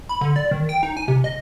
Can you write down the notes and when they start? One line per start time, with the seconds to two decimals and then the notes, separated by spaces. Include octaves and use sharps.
0.09 B5
0.21 D3
0.36 D5
0.51 D#3
0.69 G5
0.83 D#4
0.97 G#5
1.08 C3
1.24 D#5